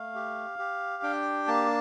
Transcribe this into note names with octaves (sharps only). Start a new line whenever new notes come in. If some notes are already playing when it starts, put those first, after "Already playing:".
Already playing: A3 F5
G4
G4
D4 G5
A#3 A5